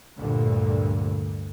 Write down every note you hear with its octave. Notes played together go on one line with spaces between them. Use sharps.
D2 G2 A#2 D3